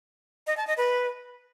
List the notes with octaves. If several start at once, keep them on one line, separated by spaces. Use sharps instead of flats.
D#5
A5
D#5
B4